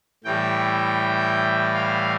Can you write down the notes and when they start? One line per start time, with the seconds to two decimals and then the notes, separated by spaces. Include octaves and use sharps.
0.24 A2 E3 G3 G5
1.74 F5